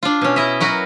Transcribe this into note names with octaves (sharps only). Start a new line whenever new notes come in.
D4 F4
B2 C#4
E4 D#5 E5
F#3 F#4 A#4 B4